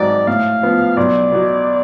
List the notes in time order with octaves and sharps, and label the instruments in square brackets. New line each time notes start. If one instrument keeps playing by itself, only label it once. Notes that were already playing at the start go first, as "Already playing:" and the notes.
Already playing: [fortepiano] G#1 G#2 F#3 [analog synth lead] D5
[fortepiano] A2 [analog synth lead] F5
[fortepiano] F3 B3
[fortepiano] B1 [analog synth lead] D5
[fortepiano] B2 F#3